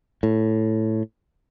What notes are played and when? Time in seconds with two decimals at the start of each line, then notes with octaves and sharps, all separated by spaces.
0.23 A2